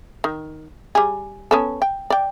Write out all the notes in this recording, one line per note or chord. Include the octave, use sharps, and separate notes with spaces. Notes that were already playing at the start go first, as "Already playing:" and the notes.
D#3
G3 G#4
B3 C#4 A4
G5
D5 G5